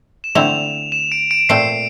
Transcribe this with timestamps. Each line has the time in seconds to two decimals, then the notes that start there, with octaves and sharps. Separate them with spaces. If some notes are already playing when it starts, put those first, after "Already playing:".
0.24 E7
0.35 D3 A3 C4 E4 F7
0.92 E7
1.12 D7
1.31 D7
1.49 A#2 A3 C4 C7